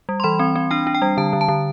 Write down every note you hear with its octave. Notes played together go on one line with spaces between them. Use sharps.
G3
C6
E3 B5
C4
C4
D4 G5
D4
G5
G3
D3 A5
D3
A5
D3